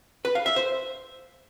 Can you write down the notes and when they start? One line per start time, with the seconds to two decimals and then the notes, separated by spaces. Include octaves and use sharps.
0.25 B4
0.35 F5
0.46 E5
0.56 C5